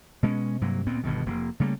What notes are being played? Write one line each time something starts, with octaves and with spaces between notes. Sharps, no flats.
B2 G#3 A3 C#4
G2 C3 F#3 A#3
D2 A#2 B3 C4
G1 G2 B2 D#3
F1 A#3
C#3 G3 A3 A#3